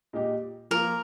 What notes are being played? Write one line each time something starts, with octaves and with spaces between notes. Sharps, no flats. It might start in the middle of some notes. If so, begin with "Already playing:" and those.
A#2 G#3 D#4 G4
F3 A#3 F4 A#4